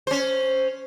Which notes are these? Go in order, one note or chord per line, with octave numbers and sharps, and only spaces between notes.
C#4 C5